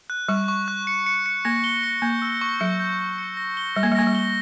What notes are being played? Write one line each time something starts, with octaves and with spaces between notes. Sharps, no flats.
F#6
G3 C#6
C#6
F#6
C#7
C#7
C#7
A#3 A#6
G7
C#7
A#3 G6
E6
C#6
F#3 G6
G6
G6
C#7
A#6
G7
G3 A#6
A#3
G3
A#3 A#6
G3
G7